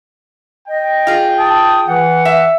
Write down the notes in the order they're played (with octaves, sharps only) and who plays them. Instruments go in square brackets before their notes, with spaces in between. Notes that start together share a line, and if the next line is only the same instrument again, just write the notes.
[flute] D#5 [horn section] G5
[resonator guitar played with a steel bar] F4 G#4
[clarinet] A5 [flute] D#6
[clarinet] E3 [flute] F#5
[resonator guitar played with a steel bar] E5